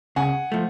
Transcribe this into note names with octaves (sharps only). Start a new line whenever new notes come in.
C#3 F#5 G#5
F3 A3